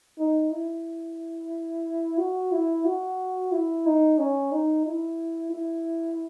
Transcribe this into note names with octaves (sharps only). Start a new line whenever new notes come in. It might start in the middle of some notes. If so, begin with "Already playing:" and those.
D#4
E4
F#4
E4
F#4
E4
D#4
C#4
D#4
E4
E4